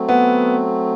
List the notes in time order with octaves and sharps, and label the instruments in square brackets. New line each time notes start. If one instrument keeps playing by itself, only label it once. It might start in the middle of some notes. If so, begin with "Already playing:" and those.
Already playing: [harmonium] F#3 A3 C4
[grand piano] B3